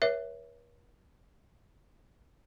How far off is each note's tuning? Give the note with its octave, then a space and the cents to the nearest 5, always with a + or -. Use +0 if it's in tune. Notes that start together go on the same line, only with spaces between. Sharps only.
A#4 +45 C#5 +0 E5 +0